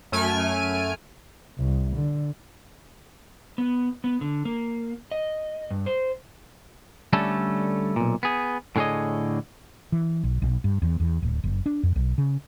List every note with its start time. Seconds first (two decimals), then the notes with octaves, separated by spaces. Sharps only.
0.12 F#2 A3 G#5 F6 D7
1.58 C2
1.96 D3
3.58 B3
4.04 B3
4.21 D3
4.45 A#3
5.12 D#5
5.71 G2
5.86 C5
7.13 D3 G3 A3 C#4 A4
7.96 B1 A#2
8.23 B3 G#4
8.76 A2 D3 G#4 C#5 D#5
9.92 E3
10.23 B1
10.42 B1
10.64 G2
10.82 E2
11.00 E2
11.22 D1
11.43 F#1
11.66 D4
11.83 F2
11.96 B1
12.18 C#3